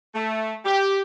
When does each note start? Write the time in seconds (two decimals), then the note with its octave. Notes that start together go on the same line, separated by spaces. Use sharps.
0.14 A3
0.65 G4